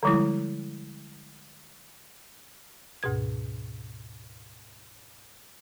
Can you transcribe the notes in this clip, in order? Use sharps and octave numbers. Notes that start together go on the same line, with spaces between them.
D3 F3 G3 G#3 E4
D2 G#2 B2 G#6